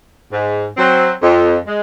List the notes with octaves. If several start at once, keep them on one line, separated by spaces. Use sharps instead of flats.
G#2
F#3 C4
F2
G#3